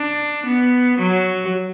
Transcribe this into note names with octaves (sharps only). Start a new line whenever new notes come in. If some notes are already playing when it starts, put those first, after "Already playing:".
Already playing: D4
B3
F#3